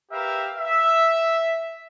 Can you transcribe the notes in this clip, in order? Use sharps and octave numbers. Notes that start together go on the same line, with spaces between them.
G4 A#4 B4 E5 F5
E5